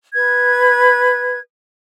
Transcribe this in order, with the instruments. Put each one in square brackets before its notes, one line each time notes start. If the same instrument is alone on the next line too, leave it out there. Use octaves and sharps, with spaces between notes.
[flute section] B4 G#6